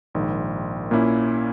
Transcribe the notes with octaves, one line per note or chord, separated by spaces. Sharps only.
A#1 G#2 D#3
A#2 A#3 C#4 E4